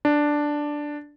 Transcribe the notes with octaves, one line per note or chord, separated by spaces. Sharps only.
D4